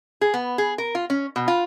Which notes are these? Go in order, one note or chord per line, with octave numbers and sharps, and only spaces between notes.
G#4
B3
G#4
A#4
F4
C#4
B2
F4